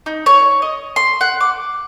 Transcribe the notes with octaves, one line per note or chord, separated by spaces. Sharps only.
D#4
C#5
D#5
C6
F#5
D6